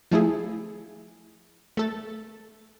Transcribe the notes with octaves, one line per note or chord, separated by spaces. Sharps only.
F3 A3 E4 G#4
A3 A4 A6